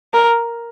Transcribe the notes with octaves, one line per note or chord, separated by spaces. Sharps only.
A#4